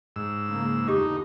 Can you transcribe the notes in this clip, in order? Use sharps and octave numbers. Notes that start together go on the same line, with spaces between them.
G#2 E6
C#3 A#3
E2 D3 D#4 F4 G4 D6